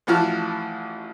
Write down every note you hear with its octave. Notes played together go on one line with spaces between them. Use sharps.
A1 E3 F3 F#4 A5 F6